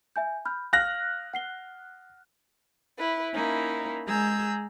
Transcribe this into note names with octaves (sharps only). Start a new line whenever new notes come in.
E5 G#5 G6
B5 F6 G6
F5 F6 F#6 A#6
F#5 C7 G7
E4 B4
A#3 C#4 D#4 E4
G#3 G#4 A#5 E6 G6